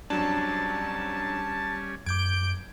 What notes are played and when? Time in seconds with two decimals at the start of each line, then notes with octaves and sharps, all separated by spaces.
0.10 F2 F#3 G3 C#4 D4 A5
2.06 F#2 D6 G6 G#6 D7